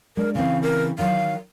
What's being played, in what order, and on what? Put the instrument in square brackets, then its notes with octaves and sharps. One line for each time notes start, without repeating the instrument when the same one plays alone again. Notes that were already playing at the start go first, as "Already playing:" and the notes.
[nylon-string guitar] G#3 D4 [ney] A#4
[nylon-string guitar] C#3 E3 C4 [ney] F5
[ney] A#4
[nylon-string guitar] D#3 F#3 [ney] F5